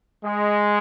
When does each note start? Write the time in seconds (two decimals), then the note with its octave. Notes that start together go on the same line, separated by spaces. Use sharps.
0.24 G#3